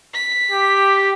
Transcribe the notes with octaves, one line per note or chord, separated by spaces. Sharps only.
B6
G4